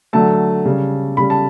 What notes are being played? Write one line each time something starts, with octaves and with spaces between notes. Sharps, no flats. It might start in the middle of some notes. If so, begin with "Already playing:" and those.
D3 F#3 A3 A5
C#3 G3
C#3 G3 B5
A5